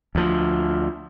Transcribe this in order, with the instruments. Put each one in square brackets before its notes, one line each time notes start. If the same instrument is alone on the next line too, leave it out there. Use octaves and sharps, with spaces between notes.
[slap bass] D2 F3